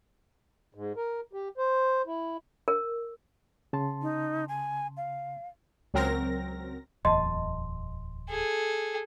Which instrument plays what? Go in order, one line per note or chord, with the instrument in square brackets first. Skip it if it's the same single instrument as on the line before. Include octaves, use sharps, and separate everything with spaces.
[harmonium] G#2
A#4
G4
C5
E4
[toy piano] A#4
[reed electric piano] C#3 A5 C6
[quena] D#4
G#5
F5
[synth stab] C#2 F#3 C4 A#4 A#6
[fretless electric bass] D1 E2 [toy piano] D#5 A5 [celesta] C6
[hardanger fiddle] G#4 A4